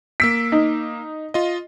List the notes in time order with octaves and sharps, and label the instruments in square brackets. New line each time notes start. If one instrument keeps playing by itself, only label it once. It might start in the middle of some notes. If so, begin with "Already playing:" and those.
[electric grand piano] A#3 E6 D7 [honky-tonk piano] B6
[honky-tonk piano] D#4
[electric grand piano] F4 D#5